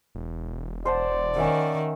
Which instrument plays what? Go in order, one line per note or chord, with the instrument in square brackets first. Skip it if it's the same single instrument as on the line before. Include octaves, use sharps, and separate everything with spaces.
[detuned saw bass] E1
[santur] C5 F#5 A5 [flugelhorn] D5
[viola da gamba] D#3 [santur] C#4 E5 F#5